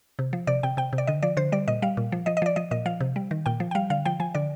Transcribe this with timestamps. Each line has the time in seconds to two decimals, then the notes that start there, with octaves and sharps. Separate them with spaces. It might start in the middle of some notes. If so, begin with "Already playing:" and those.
0.19 C3
0.33 F3
0.47 C3 D5
0.63 C3 G5
0.77 C3 G5
0.93 C3
0.98 D5
1.07 D3 D#5
1.22 F3 D5
1.37 D3 C5
1.52 G3 D5
1.68 A#2 D#5
1.82 G3 F5
1.97 A#2
2.12 F3
2.26 F3 D#5
2.37 D#5
2.42 F3 D5
2.56 F3 D#5
2.71 A#2 D#5
2.86 F3 F5
3.01 C3
3.16 G3
3.31 D#3
3.46 A#2 G5
3.60 F3
3.71 G5
3.75 G3 F5
3.90 D3 F5
4.05 F3 G5
4.20 F3 G#5
4.35 D3 D5